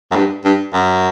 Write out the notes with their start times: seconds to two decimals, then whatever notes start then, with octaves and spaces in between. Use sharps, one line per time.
0.11 F#2
0.15 G2
0.45 G2
0.74 F#2